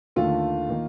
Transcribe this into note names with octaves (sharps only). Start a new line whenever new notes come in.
D#2 D3 A3 F4
D#3 A#3